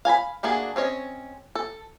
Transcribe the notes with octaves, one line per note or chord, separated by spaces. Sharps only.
F5 G#5 A#5 B5
A3 A#3 D4 F#4 G#4
C4 C#4 C#5 D#5
A4